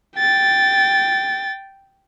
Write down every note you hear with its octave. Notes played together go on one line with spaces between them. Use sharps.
G5 A6